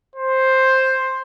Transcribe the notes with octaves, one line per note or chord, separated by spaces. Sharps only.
C5